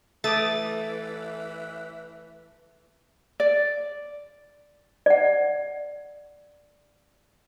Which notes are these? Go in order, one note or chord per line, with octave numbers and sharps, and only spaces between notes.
E3 A3 D6 D#6 A6
D5
D5 F#5